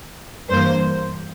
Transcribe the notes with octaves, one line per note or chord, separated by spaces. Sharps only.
G2 E3 A#3 C5